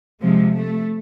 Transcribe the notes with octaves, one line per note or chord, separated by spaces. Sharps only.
C3 F3 G#3
A3